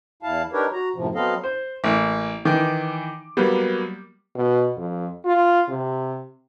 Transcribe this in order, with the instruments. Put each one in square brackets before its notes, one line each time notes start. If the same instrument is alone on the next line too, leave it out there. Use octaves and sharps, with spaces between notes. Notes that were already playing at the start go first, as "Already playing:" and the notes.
[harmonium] E2 E4 F5 A5
D4 D#4 G4 A#4 B4 C#5
F#4 A#5
F#2 A2 C3 F3
F#3 B3 C4 A4 D#5 F5
[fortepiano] C5
[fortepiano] A1 [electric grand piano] A#3
[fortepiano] D#3 [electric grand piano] E3 D6
[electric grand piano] F#3 A#3 B3 [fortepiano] G3
[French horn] B2
F2
F4
C3